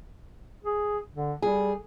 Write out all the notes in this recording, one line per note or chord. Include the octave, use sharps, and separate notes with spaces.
G#4
D3
G3 G#4